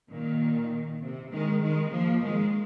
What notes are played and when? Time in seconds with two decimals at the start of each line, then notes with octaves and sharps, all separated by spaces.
0.11 A#2 D#3
1.02 C3
1.31 D#3 G#3
1.61 D#3 G#3
1.91 F3 A#3
2.21 D#3 G#3